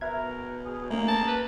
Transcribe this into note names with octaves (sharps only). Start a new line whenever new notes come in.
B2 A#4 B4 E5 G#6
G#4
A3 A#3 C#4
A5
B4